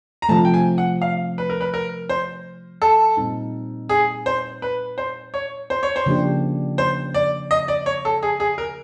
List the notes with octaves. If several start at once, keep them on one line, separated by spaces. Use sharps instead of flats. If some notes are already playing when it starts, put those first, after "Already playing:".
A#5
C3 F3 A3 A5
G5
G#5
F#5
F5
B4
A#4
B4
A#4
C5
A4
A#2 G3 C4 D#4
G#4
C5
B4
C5
C#5
C5
C#5
C5
C#3 F3 A#3 D4 G4
C5
D5
D#5
D5
C#5
A4
G#4
G#4
A#4